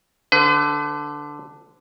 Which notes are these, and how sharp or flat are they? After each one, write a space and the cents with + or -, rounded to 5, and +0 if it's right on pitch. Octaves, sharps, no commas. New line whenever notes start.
D3 +0 B4 +40